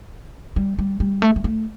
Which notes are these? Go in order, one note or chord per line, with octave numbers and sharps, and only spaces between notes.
G3
G3
G3
A3
G3
A3